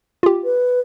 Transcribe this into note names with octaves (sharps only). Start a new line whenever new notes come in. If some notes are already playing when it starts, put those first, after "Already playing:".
F4 G4
B4